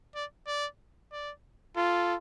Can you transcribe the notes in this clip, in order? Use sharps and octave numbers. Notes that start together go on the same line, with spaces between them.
D5
D5
D5
F4 A4